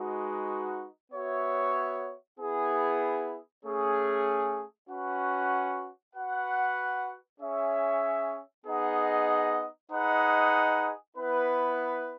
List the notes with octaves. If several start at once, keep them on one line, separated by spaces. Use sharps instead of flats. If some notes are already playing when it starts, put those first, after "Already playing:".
Already playing: G#3 D#4 F#4 B4
B3 F#4 C#5 E5
B3 E4 G#4
A3 C#4 G#4
C#4 F#4 B4 F#5
F#4 B4 F#5
C#4 G#4 C#5 E5
B3 D#4 G#4 D#5 F#5
D#4 G#4 B4 D#5 F#5
B3 E4 B4